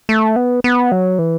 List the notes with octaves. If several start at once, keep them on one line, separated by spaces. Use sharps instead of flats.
A3
B3
B3
F#3
E3